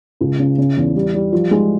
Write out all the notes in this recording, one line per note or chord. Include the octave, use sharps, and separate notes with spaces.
C#2
C#3
C#3
E2
G3
G3
F3
G#3